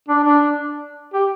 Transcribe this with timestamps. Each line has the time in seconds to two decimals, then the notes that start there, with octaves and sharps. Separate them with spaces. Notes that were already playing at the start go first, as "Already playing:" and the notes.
0.08 D4
0.24 D4
1.13 G4